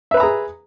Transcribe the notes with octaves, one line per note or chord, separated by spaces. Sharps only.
G#4 B4 E5 A#5 B5